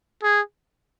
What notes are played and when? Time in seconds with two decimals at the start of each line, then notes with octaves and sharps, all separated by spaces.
0.23 G#4